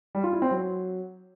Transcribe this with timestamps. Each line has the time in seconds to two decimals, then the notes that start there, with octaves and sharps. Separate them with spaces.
0.15 G3
0.24 F4
0.33 E4
0.42 C4
0.51 F#3